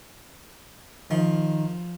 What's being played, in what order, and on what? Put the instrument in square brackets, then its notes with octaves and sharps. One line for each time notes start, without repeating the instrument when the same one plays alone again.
[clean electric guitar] D#3 [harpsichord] F3